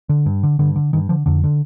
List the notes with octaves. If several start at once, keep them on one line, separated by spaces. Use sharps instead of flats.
D3
G2
D3
G2 D3
D3
G2 D#3
D3 F3
F2 D3
D3